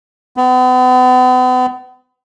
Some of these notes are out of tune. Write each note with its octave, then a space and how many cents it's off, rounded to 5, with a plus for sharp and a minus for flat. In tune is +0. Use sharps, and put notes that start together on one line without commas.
B3 +40